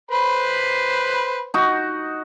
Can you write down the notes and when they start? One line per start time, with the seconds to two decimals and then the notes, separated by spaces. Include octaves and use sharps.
0.11 B4 C5 B5
1.54 D#4 F#4